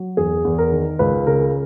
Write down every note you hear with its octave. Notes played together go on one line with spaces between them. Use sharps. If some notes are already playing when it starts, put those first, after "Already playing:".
Already playing: F#3
E2 G#4
E2
A#4
D#3
C#2 B4
C#3 A#4